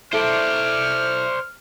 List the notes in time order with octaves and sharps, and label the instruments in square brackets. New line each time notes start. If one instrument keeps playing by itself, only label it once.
[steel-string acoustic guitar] E4 A4 [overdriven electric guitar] C5 D5 [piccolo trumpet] F6